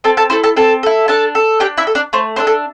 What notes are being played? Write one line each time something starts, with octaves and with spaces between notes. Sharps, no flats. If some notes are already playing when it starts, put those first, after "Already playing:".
C4 A4 A5
A4 A5
E4 A4 C5 C6
A4 A5
C4 A4 A5
E4 A4
D4 A4 A5
A4
D4 G4 G5
E4 E5
A4
D4 D5
A3 C5
D4 A4 C5
A4